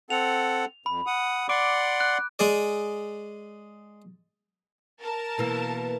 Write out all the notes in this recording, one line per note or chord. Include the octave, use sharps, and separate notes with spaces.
C4 A4 F#5 F7
F2 B5
F#5 D#6
D5 F#5 C6 D6 D7
F#6
G#3 G#4 D5
A#4 A5
B2 E3 A#3